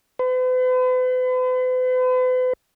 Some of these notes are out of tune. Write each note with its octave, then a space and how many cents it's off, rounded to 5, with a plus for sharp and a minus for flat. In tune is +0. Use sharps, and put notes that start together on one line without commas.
B4 +45